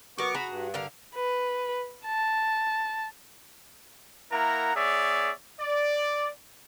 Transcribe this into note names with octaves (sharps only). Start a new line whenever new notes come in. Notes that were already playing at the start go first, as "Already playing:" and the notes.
F#3 B3 A#4 C#6 D6
F#4 G#4 A#5 B5
G2
D3 A#4 F5
B4
A5
A#3 E4 A#4 F#5 A#5
B3 G#4 C#5 D5 E5
D5